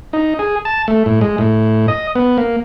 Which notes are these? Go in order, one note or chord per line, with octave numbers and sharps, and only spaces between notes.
D#4
G#4
A5
A3
A2
G#3
A2
D#5
B3
A#3